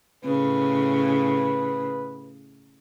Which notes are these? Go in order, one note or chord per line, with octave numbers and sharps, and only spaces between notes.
A2 C#3 B4